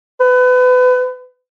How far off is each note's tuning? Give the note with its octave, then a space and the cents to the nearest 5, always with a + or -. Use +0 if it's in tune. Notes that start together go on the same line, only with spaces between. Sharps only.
B4 +30